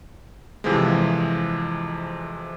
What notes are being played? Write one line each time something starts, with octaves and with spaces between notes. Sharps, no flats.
F2 C3 E3 F3 G#3